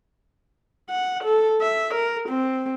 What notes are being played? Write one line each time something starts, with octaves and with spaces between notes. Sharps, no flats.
F#5
A4
E5
A#4
C4